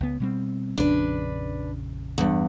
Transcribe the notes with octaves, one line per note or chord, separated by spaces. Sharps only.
C#2 B3
B2 G3 C4
A#1 F2 C#3 D4 B4
E2 G2